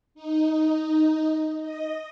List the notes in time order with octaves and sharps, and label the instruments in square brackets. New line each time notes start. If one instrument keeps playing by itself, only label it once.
[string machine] D#4
D#5